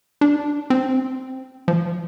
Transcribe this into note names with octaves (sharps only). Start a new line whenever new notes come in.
D4
C4
F3